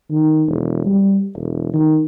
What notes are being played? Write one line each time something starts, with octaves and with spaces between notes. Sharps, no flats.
D#3
E1
G3
E1
D#3